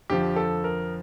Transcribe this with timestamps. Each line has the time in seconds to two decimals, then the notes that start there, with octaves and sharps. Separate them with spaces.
0.10 F2 D3 F3 G4
0.36 A4
0.64 A#4